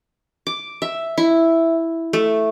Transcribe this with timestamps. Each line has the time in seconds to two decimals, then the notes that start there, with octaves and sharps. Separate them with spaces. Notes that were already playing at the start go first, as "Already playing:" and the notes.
0.47 D6
0.82 E5
1.18 E4
2.13 A3